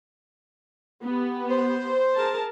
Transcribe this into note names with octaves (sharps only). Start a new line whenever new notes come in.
B3 G4
C5
G#4 A#4 A5